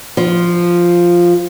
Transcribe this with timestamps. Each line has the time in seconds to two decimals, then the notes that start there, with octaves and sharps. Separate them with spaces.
0.17 F3